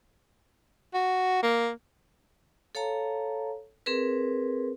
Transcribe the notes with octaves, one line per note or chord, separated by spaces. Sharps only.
F#4
A#3
A4 C#5 F5 A5 A#5
C4 G#4 A#4 B4